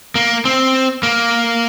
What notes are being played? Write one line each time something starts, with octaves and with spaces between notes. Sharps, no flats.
A#3
C4
A#3